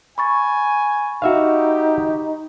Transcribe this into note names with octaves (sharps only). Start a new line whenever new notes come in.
G#5 B5 C#6 A6
D#4 F#4 G4 E5 F5